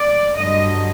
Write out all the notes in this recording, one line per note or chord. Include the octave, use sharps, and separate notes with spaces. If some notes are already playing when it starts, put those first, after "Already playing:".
Already playing: D5
G2 D3 F#3 D#5